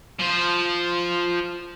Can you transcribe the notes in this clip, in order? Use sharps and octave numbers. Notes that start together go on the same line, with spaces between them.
F3 C5